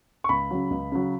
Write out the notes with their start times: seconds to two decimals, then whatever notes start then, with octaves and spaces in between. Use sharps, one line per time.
0.24 C#6
0.29 C#2 B5
0.51 C#3 F#3
0.71 C#2
0.92 C#3 F#3